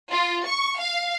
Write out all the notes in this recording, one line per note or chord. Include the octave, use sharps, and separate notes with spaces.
F4
C#6
F5